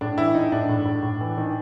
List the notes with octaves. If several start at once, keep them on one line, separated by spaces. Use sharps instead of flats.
A2 D4
E3 E4
A2 D#4
A2 D4
A2
A2
A2
E3
D#3